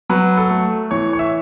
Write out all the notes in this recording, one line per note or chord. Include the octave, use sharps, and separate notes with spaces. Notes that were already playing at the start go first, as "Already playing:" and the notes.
F#3 B4
A4
A3
E3 C#5
C#5
E5